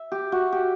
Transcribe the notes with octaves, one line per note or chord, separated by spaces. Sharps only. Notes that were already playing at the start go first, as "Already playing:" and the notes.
Already playing: E5
G4
F#4
G4